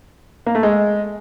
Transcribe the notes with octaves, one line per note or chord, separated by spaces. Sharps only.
A#3
A3
G#3